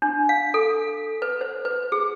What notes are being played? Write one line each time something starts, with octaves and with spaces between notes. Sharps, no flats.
D4
F5
A4
B4
C5
B4
G#4